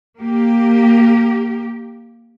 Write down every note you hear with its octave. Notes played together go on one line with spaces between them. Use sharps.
A#3 G4